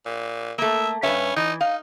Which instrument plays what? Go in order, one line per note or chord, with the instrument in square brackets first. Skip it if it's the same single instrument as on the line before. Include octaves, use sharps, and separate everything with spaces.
[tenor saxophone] A#2
[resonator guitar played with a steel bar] A3 A#3 [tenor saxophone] E5
[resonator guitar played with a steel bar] G2 B4 E5 [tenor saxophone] C#4
[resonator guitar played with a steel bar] E3 [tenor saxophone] D#4
[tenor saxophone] D#4 [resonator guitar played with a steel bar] F5